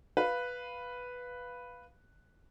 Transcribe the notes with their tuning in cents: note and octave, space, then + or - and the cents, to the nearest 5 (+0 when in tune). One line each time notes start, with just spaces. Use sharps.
B4 +0 F5 +0